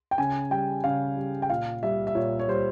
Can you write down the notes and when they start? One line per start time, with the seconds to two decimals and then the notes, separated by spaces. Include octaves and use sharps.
0.11 G5
0.18 C#3 G#5
0.51 G3 G5
0.84 C#3 F5
1.17 G3
1.42 G5
1.49 A#2 F5
1.83 G3 E5
2.07 E5
2.15 A#2 C#5
2.39 C#5
2.48 G3 C5